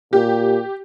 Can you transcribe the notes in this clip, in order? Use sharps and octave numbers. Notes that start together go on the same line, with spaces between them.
A#2 G4